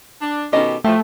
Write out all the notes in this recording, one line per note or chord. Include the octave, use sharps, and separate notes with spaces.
D4
B2 D#3 C#4 G4 A4 D#5
A2 F3 A3 G4